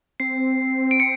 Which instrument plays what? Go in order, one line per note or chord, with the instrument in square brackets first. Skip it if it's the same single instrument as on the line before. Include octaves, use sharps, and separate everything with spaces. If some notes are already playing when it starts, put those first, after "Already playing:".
[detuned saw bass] C4 [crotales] C7
[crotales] D7
C#7